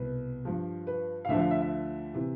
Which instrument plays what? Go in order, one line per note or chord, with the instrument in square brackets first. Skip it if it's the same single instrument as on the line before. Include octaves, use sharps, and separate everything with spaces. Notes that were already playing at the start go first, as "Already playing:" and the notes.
Already playing: [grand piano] C2 B2 B4
G2 F3
B4
F5
D2 D3 F3 E5
F5
E5
E5
C3 E3